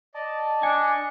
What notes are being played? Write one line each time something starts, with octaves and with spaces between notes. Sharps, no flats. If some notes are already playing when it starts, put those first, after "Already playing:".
D5 D#5 A5
D4 G#5 C#7